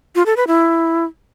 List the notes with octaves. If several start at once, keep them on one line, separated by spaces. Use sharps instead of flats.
F4
A4
B4
E4